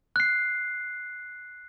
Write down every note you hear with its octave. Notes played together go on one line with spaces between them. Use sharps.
F#6 C7